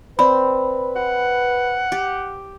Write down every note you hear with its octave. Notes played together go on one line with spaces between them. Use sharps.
C4 B4 D5 B5
F#5
G4